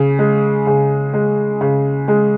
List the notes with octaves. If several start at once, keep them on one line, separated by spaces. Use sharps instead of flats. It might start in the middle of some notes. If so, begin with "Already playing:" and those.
Already playing: C#3
G#3
C#3
G#3
C#3
G#3